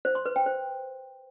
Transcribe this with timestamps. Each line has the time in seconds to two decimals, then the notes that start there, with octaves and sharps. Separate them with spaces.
0.05 C5
0.15 C6
0.26 B4
0.36 G5
0.46 C5